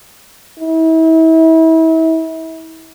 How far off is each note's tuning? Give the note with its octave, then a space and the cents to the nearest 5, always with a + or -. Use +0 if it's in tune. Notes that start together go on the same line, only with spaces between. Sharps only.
E4 -35